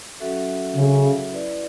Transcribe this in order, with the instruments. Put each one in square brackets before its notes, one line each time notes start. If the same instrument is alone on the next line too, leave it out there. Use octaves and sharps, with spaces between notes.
[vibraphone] F#3 C#4 F#4 A4 E5
[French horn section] C#3
[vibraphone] E4 B4 D5